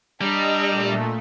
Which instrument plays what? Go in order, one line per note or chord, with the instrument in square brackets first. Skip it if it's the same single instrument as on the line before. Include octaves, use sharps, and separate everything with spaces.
[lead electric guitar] G3 [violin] D4 A#5 [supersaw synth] D#5 E6
[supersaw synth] A#2 A3